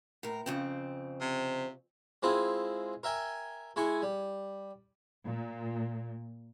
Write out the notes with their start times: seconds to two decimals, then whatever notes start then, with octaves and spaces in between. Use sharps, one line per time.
0.23 A2 A#4
0.46 F2 C#3 C4
1.21 C3
2.23 G#3 C4 E4 F4 G#4
3.03 A#4 E5 G5 G#5
3.76 G#3 E4 G#5 C#6
4.02 G3
5.25 A#2